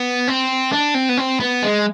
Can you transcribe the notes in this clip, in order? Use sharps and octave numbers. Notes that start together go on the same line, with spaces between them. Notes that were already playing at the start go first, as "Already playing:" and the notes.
Already playing: B3
C4
D4
C4
B3
C4
B3
G#3